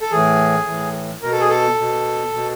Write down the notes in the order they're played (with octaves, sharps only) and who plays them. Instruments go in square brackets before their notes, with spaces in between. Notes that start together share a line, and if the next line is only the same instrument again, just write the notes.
[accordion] A4
A2 E3 G#4
A2 E3
B2 A#4
A4
G#4
A4
B2
B2